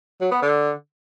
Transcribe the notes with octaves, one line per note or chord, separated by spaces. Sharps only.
F#3
B3
D3